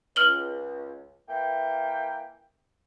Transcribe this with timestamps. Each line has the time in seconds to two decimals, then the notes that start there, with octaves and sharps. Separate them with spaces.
0.16 C#2 F6 F#7 G7
1.28 E3 A#3 G5